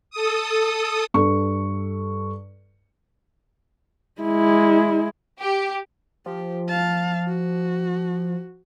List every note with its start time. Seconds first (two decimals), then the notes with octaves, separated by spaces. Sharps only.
0.10 A4 D#6
1.14 G2 A4 C#6
4.21 G#3 E4
5.39 G4
6.26 F3 G4
6.69 F5 A5
7.28 F#4